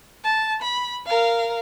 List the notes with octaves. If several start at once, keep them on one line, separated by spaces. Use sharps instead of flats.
A5
B5
A#4 F5